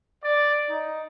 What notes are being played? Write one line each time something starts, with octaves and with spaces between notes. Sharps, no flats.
D5
D#4